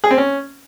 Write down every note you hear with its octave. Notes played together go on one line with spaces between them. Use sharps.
G#4
C4
C#4